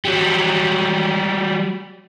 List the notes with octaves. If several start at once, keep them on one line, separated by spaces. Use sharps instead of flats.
F#3 G3